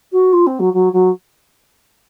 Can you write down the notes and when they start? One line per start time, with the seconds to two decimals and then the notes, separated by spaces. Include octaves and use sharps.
0.12 F#4
0.32 F4
0.46 C4
0.59 F#3
0.73 F#3
0.92 F#3